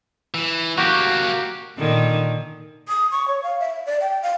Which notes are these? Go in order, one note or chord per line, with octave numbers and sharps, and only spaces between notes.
E3
F#3 A#3 F#4 G4
A#2 D3 D#3
D#6
C#6
C#5
F5
E5
D5
G5
F5